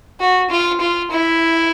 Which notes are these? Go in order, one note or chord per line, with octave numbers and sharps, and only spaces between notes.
F#4
F4
F4
E4